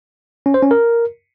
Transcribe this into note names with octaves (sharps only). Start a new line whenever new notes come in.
C#4
C5
C#4
A#4